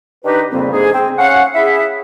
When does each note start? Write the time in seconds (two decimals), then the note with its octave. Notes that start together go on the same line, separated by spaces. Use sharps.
0.24 D#3 D4 D#4 G4 B4
0.52 F2 A#2 C#3 G3 A#3 C4
0.72 G#2 D3 A#3 G#4
0.93 C4
1.18 C#4 F5 F#5
1.55 E4 G#4 E5